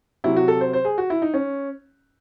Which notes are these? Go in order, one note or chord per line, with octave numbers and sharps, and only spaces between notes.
C3 F#3 E4
F#4
A4
C5
C5
G#4
F#4
E4
D#4
C#4